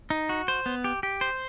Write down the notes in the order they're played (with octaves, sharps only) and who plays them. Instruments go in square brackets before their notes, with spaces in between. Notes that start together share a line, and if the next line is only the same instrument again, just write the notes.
[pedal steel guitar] D#4
F#4
C5
B3
G4
G4
C5